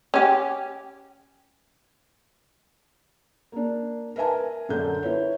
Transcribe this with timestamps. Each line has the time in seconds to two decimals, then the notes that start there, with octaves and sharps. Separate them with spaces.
0.14 C#4 G4
3.52 A#3 D4
4.16 A#4 B4 E5 G#5 A5
4.69 F#2 D3 A4 G6
5.03 E4 B4 C#5